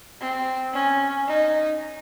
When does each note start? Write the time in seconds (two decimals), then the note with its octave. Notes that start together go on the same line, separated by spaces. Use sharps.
0.20 C4
0.73 C#4
1.28 D#4